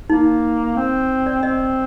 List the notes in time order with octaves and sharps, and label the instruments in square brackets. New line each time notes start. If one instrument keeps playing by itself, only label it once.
[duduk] A#3 [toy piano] D#4
[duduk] C4
[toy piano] D5
[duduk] C4 [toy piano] D#5